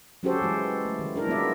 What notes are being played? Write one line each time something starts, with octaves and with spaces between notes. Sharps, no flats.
F#3 C#4 F#4 G4 A4 C5
E3 G#3 E4
A3
D#3
D4 E4 A#4
F#3 G#3 B3 F4 D5 E5